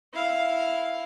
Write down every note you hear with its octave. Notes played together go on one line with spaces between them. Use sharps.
E4 F5